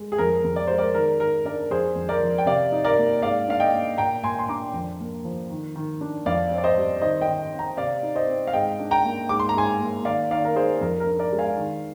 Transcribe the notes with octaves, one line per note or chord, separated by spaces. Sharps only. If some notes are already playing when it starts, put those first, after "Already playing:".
Already playing: G#3
G#4
F2 A#4
F2
D5
G#3 C5
A#4 D5
D#3 A#4
D#3 A#4
D4 A#4 D5
F2 G#4 C5
F2
A#4 D5
F3
G5
C3 D5 F5
D#4
A#4 D5
A#3
G#2 D5 F5
D4 F5
D#5 G5
A#3
A#2 G5 A#5
A#2 G#5 C6
C6
D4 A#5 D6
F2
A#3
F3
D#3
D#3
D4
F2 D5 F5
C4
D5
C5 D#5
G3
D#3 C5 D#5
D#5 G5
D#3
C4
G5 A#5
C3 D5 F5
D#4
C5 D#5
C4
F5
G#2 D#5 G5
D4
G5 A#5
A#3
G#2 D6
C6
A#5
G#2 G#5 C6
A#3
D#3 D5 F5
D#3 D5 F5
A#4
D#4 G#4 C5
G#4
F2 A#4
A#4
D4
A#4 D5
G#3
F5 G#5
D#3